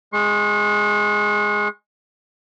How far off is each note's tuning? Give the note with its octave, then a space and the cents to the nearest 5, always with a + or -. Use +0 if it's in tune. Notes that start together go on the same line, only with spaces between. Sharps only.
G#3 +0 C#6 -45